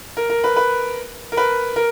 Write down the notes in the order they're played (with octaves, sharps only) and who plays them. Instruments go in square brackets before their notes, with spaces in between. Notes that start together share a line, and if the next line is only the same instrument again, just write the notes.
[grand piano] A#4
A#4
B4
B4
A#4
B4
A#4